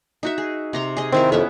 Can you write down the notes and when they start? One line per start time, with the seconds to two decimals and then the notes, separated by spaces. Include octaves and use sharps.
0.23 D#4 F#4 E5
0.38 G#4
0.73 C3 A#5 C6
0.97 G#4 D#5
1.12 D#3 C4 E4 A#4
1.32 F2 B3 C#4 E5